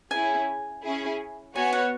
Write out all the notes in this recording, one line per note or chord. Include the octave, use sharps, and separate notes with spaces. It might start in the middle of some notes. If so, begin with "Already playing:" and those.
C#4 E4 G#4 G#5
C#4 E4 G#4
B3 F#4 C#5 G#5
F#5